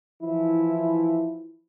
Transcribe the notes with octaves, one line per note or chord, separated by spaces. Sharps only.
E3 F3 E4